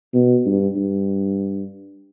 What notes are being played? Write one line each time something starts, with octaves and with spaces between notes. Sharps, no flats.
B2
G2
G2